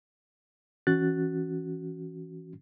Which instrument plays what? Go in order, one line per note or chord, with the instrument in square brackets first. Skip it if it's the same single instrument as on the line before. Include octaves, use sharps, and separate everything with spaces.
[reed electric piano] E3 C#4 F#4 F#6 A6